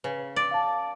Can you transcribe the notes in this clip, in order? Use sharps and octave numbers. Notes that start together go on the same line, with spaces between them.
C#3 B4
D5
F5 A5